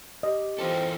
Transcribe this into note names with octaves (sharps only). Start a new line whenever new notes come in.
G4 D#5
E3 C4 F4 A4